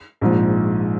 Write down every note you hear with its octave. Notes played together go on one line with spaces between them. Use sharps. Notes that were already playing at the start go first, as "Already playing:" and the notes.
A#1 G#2 F3